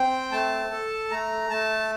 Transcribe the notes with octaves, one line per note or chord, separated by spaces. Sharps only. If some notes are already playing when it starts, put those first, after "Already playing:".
Already playing: C4 G5
A3 A5
A4
A3 A#5
A3 A5